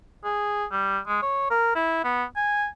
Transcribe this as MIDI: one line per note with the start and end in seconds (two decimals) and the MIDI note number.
0.24 0.65 68
0.71 0.99 55
1.07 1.22 56
1.22 1.50 73
1.50 1.74 70
1.75 2.02 64
2.04 2.24 59
2.36 2.66 80